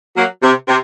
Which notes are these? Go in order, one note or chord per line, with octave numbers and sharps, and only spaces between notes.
F#3 A#3
C3
C3